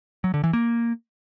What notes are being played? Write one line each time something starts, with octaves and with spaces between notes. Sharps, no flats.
F#3
D3
E3
A#3